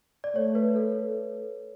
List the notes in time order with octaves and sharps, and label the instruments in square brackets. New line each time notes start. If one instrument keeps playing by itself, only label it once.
[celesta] D5
[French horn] A3 [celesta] C#5
[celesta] B4
B4
A4